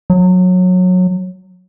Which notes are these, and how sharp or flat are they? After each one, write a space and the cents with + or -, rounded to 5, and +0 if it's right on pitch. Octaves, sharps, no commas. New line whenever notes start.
F#3 -20